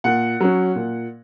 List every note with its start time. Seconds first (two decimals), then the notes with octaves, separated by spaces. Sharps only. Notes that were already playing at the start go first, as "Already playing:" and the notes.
0.04 A#2 F#5
0.40 F#3 C#4
0.76 A#2